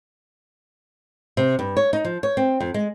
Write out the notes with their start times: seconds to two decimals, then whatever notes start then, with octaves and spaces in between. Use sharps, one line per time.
1.37 C3
1.59 G2
1.77 C#5
1.93 D#4
2.05 F3
2.23 C#5
2.37 C4
2.60 F2
2.74 G#3